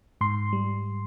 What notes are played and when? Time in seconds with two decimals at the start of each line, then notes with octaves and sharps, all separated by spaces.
0.21 G#2 C6
0.53 G3